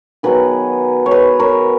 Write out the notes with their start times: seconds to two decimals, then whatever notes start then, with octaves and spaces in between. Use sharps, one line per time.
0.23 D#3 F#3 B3 G#4 B4
1.06 C#5
1.11 G#4 B4
1.39 A#4 C#5